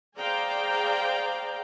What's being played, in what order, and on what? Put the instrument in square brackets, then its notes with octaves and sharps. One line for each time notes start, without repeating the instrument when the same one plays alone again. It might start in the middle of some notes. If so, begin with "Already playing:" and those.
[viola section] G#4 C5 D5 F5 G5 A#5